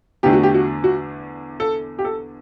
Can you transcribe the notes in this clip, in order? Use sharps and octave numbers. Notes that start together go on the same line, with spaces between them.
E2 D3 A3 D4 G4
F#4
G4
F#4
F#4
A4
G4
A4